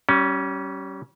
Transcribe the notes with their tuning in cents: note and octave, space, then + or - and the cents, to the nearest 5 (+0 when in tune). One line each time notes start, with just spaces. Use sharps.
G3 -30 C#4 +0